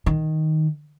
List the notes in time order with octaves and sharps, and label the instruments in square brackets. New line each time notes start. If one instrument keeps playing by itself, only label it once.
[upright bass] D#3